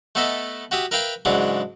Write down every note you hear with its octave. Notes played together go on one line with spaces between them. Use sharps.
A3 B3 A4 D#5 E5
F#4 G4 E5 D#6
A#4 B4 E5 F5 G5
G#2 C#3 E3 F#3 D4